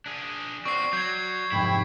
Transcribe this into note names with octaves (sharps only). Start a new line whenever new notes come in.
D4 G#4
C4 F#4 D5 C#6 C7
F#3 G6 G#6
F1 G#2 E4 G5 B5